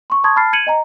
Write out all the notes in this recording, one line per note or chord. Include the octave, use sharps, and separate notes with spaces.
C6 C#6
A5 C6 C#6 D#6 G#6
A5 B5 F6 A6 C7
G#6 C#7 D#7 F#7
D#5 G#5 A#5